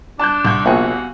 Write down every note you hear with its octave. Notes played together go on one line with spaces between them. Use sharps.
D4 A5 F#6 G6
C2 F#5 C6 C#6 G6
A#1 B3 F#4 F5 G#5